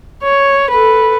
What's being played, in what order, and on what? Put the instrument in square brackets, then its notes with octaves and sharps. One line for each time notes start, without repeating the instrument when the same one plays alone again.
[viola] C#5
A4 B4